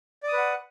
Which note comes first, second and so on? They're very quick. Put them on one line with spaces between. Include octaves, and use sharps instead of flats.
D5 D#6 B4 F#5